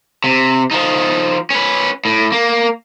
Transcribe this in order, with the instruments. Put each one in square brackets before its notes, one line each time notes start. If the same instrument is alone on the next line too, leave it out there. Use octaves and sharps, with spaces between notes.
[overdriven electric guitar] C3
F3 D#4
C#4 B4
A2
A#3